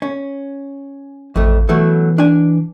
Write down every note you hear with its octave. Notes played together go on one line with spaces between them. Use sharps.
C#4
A1 F2 A3
B2 E3 F#3 A3
D4 G#5